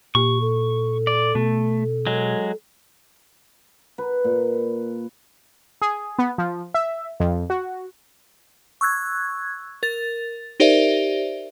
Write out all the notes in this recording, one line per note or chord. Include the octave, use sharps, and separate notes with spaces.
A#2 G4 C#6
A4
D5
B2 A3
F#3 G#3
B4
A#2
G#4
B3
F3
E5
F2
F#4
C#6 E6 F#6 G#6
A#4 A6
D#4 G4 A#4 C5 D5 E5